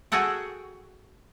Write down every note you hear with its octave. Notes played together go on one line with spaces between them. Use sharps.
F#4 G#4 A4 F#5 G5